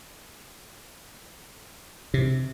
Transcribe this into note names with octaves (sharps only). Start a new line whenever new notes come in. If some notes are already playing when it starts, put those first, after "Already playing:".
C3